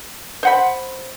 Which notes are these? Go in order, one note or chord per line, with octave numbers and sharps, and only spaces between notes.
C5 F#5 B5